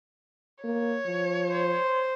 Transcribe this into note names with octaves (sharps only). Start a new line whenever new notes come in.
A#3 C#5
F3
C5